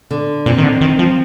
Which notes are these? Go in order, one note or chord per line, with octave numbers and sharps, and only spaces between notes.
D3
A#2 C4
D#3
D3
D#3
F3